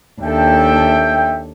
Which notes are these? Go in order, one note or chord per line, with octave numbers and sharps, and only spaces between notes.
D#2 D4 A4 E5 G5